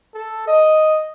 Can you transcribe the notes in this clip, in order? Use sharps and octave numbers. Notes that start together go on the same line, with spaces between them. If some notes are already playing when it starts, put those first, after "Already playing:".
A4
D#5